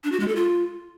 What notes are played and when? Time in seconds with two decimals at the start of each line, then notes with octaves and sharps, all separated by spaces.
0.04 D4
0.12 F#4
0.20 G#3
0.28 A4
0.36 F4